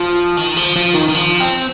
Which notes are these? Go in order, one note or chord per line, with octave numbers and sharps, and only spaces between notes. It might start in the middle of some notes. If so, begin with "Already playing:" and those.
Already playing: F3
D#3
F3
F3
D#3
D#3
F3
C4